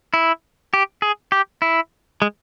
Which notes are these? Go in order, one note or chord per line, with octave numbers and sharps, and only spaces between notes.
E4
G4
G#4
G4
E4
G#3